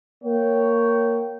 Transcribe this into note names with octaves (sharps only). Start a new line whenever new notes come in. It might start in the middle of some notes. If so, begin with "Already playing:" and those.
A#3 C#5 G5